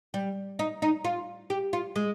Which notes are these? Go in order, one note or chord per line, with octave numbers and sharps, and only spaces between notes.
G3
D#4
D#4
F4
G4
F4
G#3